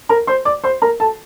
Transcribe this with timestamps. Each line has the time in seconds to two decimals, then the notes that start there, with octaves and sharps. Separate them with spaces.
0.09 A#4 A#5
0.27 C5 C6
0.45 D5 D6
0.64 C5 C6
0.82 A#4 A#5
1.00 A4 A5